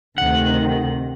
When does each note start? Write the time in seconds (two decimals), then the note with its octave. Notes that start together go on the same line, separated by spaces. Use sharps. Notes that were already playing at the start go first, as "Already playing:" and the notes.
0.18 D2 C3 D#3 F#5